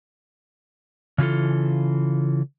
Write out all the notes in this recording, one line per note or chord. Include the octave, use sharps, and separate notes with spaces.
C#3 E3 F4 A4